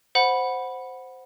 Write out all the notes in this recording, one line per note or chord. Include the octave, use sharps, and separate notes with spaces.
C5 F#5 B5